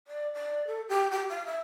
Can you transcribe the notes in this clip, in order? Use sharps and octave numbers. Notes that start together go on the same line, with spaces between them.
D5
D5
A4
G4
G4
F5
E5